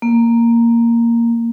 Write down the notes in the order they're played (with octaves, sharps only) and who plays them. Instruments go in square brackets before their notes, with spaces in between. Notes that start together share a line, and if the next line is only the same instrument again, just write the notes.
[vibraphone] A#3